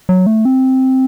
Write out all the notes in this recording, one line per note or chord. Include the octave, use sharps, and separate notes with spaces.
F#3
A3
C4